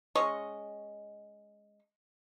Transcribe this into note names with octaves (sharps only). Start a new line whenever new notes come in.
G#3 C#4 D#5 C#6